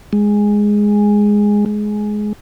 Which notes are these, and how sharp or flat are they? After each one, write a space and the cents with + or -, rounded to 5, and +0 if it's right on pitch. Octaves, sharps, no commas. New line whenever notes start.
G#3 -5
G#3 +15